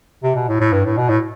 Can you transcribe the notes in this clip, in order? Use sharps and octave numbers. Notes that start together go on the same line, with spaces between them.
C3
B2
A2
A2
G2
A2
B2
A2